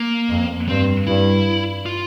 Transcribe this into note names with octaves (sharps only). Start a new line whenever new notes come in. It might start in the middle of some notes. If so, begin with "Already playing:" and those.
Already playing: A#3
F2
G2 C4
G2 E4
F4